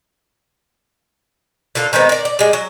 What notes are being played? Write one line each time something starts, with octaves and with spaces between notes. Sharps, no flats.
D3 F4 A4 A#4
D#3 G#3 B3 C4
A#4 D5
D5
G3 G#3
F#3